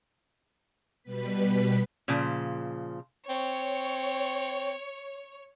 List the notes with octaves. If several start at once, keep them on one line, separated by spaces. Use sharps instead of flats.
B2 G3 B3 B4 B6
A#2 C#3 F3
C4 C#5